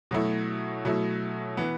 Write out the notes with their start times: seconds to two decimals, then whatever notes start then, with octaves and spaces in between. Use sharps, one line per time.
0.11 B2 F#3 A3 E4
0.85 B2 F#3 A3 E4
1.57 E3 B3